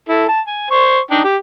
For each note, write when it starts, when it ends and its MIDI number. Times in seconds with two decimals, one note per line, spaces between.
0.09 0.24 64
0.09 0.24 69
0.29 0.40 81
0.47 0.69 80
0.71 0.99 72
0.71 0.99 85
1.11 1.21 62
1.11 1.21 63
1.11 1.21 79
1.24 1.36 67